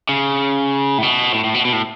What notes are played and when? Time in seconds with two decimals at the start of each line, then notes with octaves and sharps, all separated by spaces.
0.09 C#3
0.98 A2
1.03 B2
1.34 A2
1.44 A2
1.54 B2
1.65 B2
1.73 A2